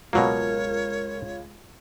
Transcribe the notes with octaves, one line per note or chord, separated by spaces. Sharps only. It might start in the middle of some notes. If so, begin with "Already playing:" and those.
C#2 B2 F#3 A#3 F4 A#4 C#5